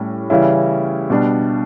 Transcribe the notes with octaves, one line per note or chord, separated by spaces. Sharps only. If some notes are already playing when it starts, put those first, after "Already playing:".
Already playing: A2 G3 C#4
C#3 E3 G3 C#4 E4
B2 G3 D4